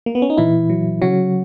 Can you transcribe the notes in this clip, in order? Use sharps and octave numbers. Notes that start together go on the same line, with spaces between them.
A#3
B3
C#4
D#4
A#2 E3 E4
F#3
C#3 F#3 F#4